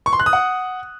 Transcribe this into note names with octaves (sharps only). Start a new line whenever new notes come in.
C#6
C6
F#6
D#6
F#5